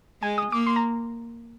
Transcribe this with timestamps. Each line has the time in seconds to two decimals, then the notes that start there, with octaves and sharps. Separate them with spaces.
0.22 G#3 G#5
0.38 D#6
0.52 A#3 D6
0.67 C6
0.76 A#5